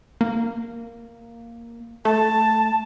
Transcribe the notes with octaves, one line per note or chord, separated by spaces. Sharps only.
A#3
A3 A5